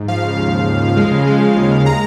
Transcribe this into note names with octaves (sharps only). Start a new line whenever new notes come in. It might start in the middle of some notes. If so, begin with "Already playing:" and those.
Already playing: G#2
F3 F5
C#3
D#2
D#2
D#2
F3
G#3
C#3
G#3
C#3
D#2
G#3
A#5